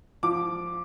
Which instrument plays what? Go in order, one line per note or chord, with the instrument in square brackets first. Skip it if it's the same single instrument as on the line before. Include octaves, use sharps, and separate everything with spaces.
[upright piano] F3 D6